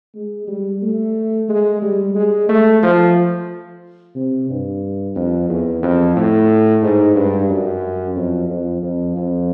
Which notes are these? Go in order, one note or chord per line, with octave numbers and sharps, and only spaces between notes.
G#3
G3
A3
G#3
G3
G#3
A3
F3
C3
G2
F2
E2
F2
A2
G#2
G2
F#2
F2
F2
F2
F2